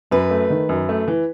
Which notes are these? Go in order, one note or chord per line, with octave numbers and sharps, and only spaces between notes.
F#2 B4
A3
D#3
F#2
A3
E3